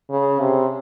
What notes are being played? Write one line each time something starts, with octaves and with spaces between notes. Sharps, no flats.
C#3
C3